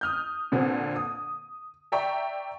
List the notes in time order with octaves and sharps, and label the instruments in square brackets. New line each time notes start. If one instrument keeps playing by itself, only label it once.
[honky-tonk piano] D#6 F6 G6
A#2 D3 B3 C4
D#6
D5 E5 G5 A#5 C#6